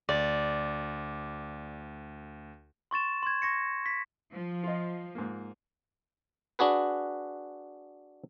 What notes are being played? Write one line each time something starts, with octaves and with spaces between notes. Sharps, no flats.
D2 D5
C6 C#6 A6 E7
C6 G#6
C#6 A#6 C#7
B6
F3
F4 D#5
G#2 A#3
D4 F#4 G#4 B4